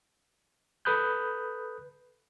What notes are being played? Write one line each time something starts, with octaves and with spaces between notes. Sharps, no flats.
A4 B4 B5 D#6 F#6 G6